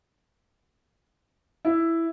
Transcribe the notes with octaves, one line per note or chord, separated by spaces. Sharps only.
E4